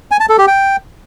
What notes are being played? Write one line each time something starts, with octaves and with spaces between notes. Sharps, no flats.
G#5
A5
A4
G4
G5